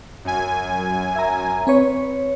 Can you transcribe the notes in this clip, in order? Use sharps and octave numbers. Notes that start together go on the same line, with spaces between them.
F#2 G#5
E5 A#5
C4 B4 C#5